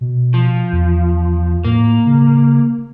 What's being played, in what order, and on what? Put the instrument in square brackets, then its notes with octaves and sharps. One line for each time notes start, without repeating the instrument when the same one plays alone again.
[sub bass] B2
[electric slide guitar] F3
[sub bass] E2
[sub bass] A2 [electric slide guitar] A#3
[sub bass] C#3